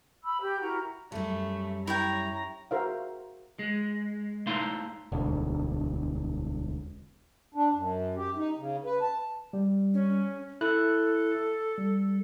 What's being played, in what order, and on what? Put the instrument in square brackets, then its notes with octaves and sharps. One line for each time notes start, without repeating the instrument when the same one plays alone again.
[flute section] B5 E6
G4 G6
E4 F#4 A#4 A#5
[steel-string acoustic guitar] F#2 G3 [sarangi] A3
[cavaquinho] E4 C#5 G5 [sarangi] A#5
[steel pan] F#4 G#4 A#4 C5 E5 F5
[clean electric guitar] G#3
A3 D#4 E4 F5 C6
[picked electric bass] E1 D2
[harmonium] D4
F#2
G4
D#4
C#3
B4
A5
[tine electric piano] G3
[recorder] C#4
[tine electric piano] E4 F#6 [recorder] A4
[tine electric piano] G3